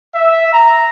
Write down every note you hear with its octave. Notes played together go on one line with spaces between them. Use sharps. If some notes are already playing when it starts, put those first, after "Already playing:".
E5
A#5